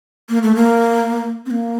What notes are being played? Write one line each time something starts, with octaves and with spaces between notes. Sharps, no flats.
A#3
A3
A#3
C4
A#3